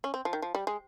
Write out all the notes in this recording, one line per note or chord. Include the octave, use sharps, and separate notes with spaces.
C#4
C4
F3
D#3
F3
G3
G#3